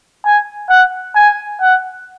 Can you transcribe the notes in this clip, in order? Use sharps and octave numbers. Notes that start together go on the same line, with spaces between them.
G#5
F#5
G#5
F#5